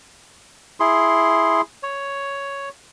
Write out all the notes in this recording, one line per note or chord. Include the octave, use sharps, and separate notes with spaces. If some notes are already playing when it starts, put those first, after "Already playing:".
E4 G#4 C6
C#5